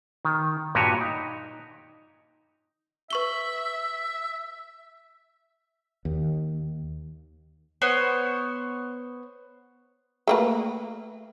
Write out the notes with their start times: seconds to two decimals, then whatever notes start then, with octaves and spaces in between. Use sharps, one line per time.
0.25 D#3
0.75 G2 A#2 F#4 G4 C#5 G#5
1.01 D#4
3.10 B4 E5 C#6 G7
6.05 D#2
7.82 B3 C5 C#5
10.27 A3 A#3 B4